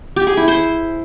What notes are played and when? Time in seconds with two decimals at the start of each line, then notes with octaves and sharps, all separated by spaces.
0.16 G4
0.27 G#4
0.37 E4
0.48 C5